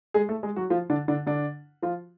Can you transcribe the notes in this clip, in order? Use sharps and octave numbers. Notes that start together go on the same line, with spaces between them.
G#3 G#4
A3 A4
G#3 G#4
F#3 F#4
F3 F4
D3 D4
D3 D4
D3 D4
F3 F4